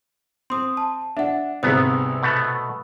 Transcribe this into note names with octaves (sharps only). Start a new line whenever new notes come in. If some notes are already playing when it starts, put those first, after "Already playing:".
C4 C6 D#6
A5
D4 E5 F#5
C2 G#2 C3 B3 D#6 E6
B2 A3 B3